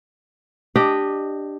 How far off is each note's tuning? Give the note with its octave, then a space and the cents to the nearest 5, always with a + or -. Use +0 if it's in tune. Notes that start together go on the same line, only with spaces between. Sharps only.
D4 +5 G4 +0 D#5 -10